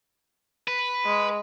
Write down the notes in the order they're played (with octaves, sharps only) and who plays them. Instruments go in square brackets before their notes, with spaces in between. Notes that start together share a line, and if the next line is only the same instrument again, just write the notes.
[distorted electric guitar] B4
[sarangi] G#3